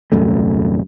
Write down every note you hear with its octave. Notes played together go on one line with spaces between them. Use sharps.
D#1 C2 F#2 A3